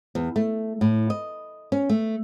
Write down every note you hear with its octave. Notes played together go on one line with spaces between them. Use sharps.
E2
A3
A2
D#5
C#4
A3